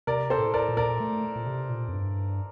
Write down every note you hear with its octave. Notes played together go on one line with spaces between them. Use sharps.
C3 A#4 D5
A4 C5
A2
A#4 D5
A#2
A#4 D5
A3
A#2
C3
A#2
F2
G2